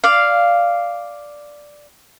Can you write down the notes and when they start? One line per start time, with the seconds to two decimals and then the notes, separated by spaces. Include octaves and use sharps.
0.04 D5 F5